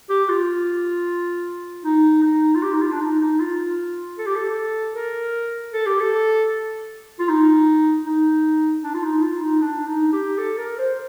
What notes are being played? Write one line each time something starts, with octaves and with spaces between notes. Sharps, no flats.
G4
F4
D#4
D#4
F4
G4
D#4
F4
D4
D#4
D#4
F4
A4
G4
A4
A#4
A4
G4
A4
F4
D#4
D#4
D4
F4
D#4
F4
D#4
D4
D#4
G4
A4
A#4
C5